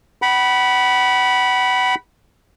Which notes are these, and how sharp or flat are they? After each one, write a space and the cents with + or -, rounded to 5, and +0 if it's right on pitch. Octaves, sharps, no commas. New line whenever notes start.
F#5 +35 B5 -10